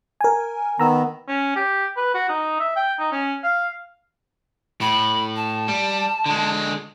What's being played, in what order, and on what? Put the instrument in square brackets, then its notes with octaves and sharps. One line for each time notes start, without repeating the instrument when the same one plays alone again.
[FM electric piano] A#4 G#5
[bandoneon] D#3 B3 [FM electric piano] A#5 E6
[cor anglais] C#4
G4
B4
F#4
D#4
E5
G5
D#4
C#4
F5
[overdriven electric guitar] A2 [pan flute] B5
[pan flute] A5
[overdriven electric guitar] G3
D3 G#3